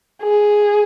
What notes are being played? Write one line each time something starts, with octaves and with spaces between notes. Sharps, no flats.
G#4